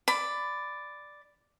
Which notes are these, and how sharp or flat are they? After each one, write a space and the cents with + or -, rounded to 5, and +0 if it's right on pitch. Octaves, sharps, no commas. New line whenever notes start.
D5 +0 B5 +15